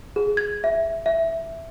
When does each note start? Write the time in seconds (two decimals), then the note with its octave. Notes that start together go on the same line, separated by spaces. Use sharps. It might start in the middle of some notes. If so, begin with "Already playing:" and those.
0.16 G#4
0.37 G#6
0.64 E5
1.06 E5